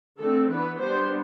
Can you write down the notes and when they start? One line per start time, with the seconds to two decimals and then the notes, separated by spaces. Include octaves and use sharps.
0.18 D3 A3 C4 A4
0.49 E3 B3 D4 B4
0.79 G3 B3 D4 C5